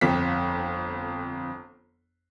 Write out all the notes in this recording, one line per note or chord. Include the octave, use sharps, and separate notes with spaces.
G1 F2 B6